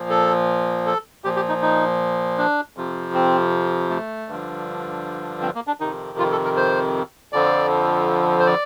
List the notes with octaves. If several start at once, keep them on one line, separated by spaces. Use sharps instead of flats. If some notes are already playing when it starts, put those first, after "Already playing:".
Already playing: A#2 F3
A4
A4
A#2 F3 G4
G4
D#4
D#4
D4
F2 C3 F3
C4
A3
G2 D3 F3
C4
A#3
D4
F2 C3 D#3 D#4
F4
A4
A#4
C5
F2 D3 F3 D5
C5
D5